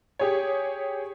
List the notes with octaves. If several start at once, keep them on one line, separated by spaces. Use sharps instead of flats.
G4 G#4 C#5